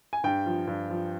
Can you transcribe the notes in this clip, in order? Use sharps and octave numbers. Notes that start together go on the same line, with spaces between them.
G#5
G2 G5
F3
G2
F3